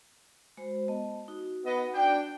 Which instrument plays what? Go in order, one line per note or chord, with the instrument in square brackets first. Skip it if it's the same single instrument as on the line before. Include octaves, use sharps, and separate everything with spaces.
[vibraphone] G#3 F#4 C5
B3 D#5 A5
D#4 F#4
[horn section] B3 D#5
D4 G5